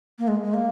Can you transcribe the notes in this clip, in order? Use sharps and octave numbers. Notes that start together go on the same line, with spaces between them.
A#3
G#3
G#3
A#3